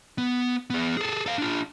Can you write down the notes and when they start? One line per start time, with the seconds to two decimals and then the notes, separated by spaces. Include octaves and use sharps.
0.18 B3
0.70 B3 G#4
0.97 G#4 A4
1.26 A4 F5
1.38 D4 F4